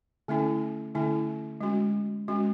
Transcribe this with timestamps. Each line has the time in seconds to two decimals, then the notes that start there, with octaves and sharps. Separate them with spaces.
0.28 D3 A3 C#4 E4
0.95 D3 A3 C#4 E4
1.61 G#3 C#4 F#4
2.28 G#3 C#4 F#4